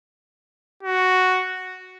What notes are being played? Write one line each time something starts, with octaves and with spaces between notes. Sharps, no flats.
F#4